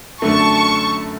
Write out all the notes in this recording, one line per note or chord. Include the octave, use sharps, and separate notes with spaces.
F#2 D3 A3 A5 C#6